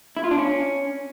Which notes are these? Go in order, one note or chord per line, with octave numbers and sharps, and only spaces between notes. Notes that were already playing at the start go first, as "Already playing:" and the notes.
E4
F4
D4
C#4